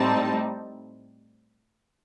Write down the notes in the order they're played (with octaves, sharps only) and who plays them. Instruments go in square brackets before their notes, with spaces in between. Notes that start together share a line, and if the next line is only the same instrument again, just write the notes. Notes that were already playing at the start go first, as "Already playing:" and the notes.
Already playing: [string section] A2 G3 C4 D#4 A5